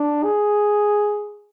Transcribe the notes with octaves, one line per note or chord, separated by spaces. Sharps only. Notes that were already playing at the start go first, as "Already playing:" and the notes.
Already playing: D4
G#4